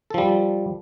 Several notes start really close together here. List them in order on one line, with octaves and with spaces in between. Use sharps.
A4 F3 G3